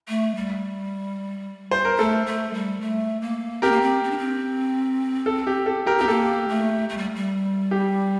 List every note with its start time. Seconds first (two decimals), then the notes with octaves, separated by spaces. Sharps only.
0.08 A3
0.35 G3
1.71 C5
1.85 A#4
1.98 A3 A4
2.26 A3
2.54 G3
2.81 A3
3.21 A#3
3.62 C4 G4 A#4
3.72 A#3
3.82 C4
4.04 C4
4.11 D4
4.18 C4
5.26 A4
5.47 G4
5.66 A4
5.86 G4 A#4
5.99 C4 G4
6.08 A#3 A4
6.49 A3
6.89 A3
6.97 G3
7.15 G3
7.71 G4